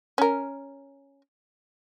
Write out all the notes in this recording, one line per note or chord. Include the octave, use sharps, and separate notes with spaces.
C#4 A#4